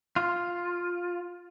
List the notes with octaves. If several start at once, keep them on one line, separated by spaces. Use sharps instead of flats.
F4